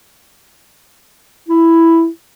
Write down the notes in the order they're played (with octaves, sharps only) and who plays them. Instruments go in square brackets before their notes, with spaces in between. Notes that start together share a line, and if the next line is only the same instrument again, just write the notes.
[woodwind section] E4